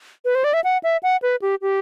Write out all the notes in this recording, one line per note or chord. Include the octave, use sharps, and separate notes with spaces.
B4
C5
D5
E5
F#5
E5
F#5
B4
G4
G4